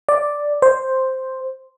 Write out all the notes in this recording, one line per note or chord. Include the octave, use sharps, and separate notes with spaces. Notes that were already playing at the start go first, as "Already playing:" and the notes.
D5
C5